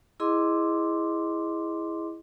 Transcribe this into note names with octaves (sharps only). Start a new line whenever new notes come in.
E4 G#4 D#5 C6 D6